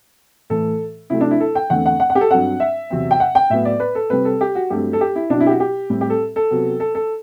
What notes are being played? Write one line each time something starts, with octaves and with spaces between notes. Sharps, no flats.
A2 E3 A3 A4
C3 F#3 A3 C4 E4
D4
E4
A4
G5
E2 D3 A3 C4 F#5
F#5
F#5
F#5
G4
A4
G2 F#3 C4 F#5
E5
E2 C3 F#3 C4
G5
F#5
G5
A2 F#3 B3 E5
D5
B4
A4
C3 G3 C4 B4
A4
G4
F#4
G2 F#3 A3 C4 G4
A4
G4
E4
B2 F#3 C4 D4
E4
G4
F#4
G4
A2 G3 C4
G4
A4
A4
C3 F#3 B3
A4
A4